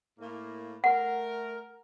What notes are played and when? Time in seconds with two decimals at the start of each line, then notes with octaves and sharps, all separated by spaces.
0.19 A2 A#3
0.84 A3 A#4 F#5